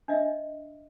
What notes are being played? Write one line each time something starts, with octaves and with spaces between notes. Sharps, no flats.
D4 D#5 E5